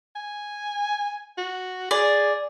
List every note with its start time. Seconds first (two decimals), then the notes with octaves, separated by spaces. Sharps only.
0.16 G#5
1.38 F#4
1.91 G#4 D5